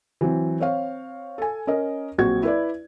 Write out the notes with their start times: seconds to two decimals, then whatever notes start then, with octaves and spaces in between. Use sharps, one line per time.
0.21 E3 F#3 C4
0.60 C4 C#5 F5
1.38 A4 G#5
1.67 C#4 A#4 D#5
2.18 A#1 F#3 C4 F#4 G#6
2.43 E4 B4 D5